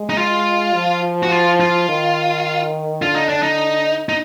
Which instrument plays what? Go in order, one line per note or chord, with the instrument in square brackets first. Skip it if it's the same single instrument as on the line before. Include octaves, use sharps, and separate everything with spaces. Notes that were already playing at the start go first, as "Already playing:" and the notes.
Already playing: [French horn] G#3
[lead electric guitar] D#4
F4
[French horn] F3
[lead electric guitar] F#4
F4
F4
[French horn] D#3
[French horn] D3 [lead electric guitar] F4
[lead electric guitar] D#4
D4
D#4
D#4